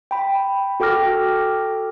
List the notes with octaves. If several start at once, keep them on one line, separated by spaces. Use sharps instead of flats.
G5 B5
F#4 A4 G5 D6 F6 A#6